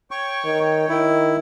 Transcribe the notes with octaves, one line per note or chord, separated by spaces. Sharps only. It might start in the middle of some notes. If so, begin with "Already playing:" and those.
C#5 G5 C#6
D#3
D#3 E4